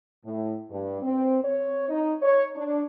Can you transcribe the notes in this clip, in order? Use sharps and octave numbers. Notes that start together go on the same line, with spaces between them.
A2
G2
C4
C#5
D#4
C#5
D4